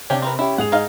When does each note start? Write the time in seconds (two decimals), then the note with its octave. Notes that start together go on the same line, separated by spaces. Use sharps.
0.10 C3 C#4 D4 G5
0.22 C4 A#4 B4
0.39 C#4 E4 G4
0.58 G#2 G#4 F#5 F7
0.72 D#4 F5